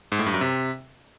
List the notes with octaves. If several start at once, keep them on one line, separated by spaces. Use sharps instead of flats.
G#2
A2
G2
F#2
C3